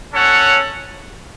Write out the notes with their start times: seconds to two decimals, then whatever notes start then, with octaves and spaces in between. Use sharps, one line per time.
0.12 C#4 A4 C#5 F#5